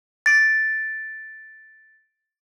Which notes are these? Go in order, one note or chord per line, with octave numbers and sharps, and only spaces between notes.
A6 D7